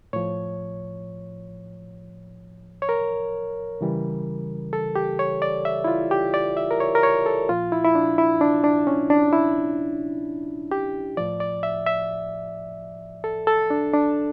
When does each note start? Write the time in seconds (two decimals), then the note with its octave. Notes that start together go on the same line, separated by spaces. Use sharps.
0.13 A2 F3 C#5
2.82 C#5
2.89 A#4
3.81 C#3 E3 G3
4.73 A4
4.96 G4
5.19 C#5
5.42 D5
5.65 E5
5.84 E4
5.87 F4
6.11 G4
6.34 D5
6.57 E5
6.71 A#4
6.80 C#5
6.95 A#4
7.03 C#5
7.26 A4
7.49 A#2 F3 F4
7.72 E4
7.85 E4
7.95 D4
8.18 E4
8.41 D4
8.64 D4
8.87 C#4
9.10 D4
9.33 E4
10.71 G4
11.17 A2 F3 D5
11.40 D5
11.63 E5
11.87 E5
13.24 A4
13.47 A4
13.70 D4
13.94 D4